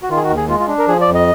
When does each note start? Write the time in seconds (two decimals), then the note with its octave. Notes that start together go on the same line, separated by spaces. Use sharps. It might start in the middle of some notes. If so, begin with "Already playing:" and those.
0.03 F#4
0.10 D#3 F4
0.17 G#4
0.23 F#4
0.30 D#2
0.36 G#4
0.49 G#3 F4
0.59 F4
0.68 D4
0.79 A#4
0.88 F3 G#4
1.01 D5
1.08 F2
1.15 D#5